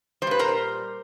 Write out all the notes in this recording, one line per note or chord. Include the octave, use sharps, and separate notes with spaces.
G3 C5
A#2 B4
A#4 C5